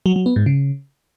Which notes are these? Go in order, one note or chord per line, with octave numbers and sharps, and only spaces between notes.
F#3
F#3
B3
G#2
C#3